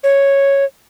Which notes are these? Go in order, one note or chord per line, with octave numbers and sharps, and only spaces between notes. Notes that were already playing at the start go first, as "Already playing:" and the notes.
C#5